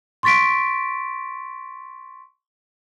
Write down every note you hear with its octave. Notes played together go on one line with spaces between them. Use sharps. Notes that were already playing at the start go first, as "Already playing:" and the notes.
C6 C#6 A6 B6 D7